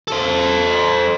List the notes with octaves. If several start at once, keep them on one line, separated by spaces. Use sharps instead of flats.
A4 C5